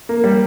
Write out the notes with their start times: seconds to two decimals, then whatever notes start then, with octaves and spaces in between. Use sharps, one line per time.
0.09 A#3
0.24 G3